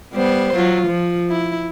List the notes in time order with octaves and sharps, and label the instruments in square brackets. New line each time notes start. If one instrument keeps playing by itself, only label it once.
[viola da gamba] G3 B3 C5
F#3 F4
F3
E4